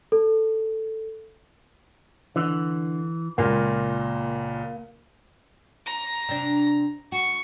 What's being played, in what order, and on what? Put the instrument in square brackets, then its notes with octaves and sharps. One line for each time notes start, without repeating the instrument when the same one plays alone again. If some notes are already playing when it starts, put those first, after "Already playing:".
[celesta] A4
[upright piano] D3 [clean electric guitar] E3
[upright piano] C#2 A#2 [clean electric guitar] A#3
[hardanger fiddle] A#5
[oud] C3 D4
[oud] F#4 [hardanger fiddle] C#6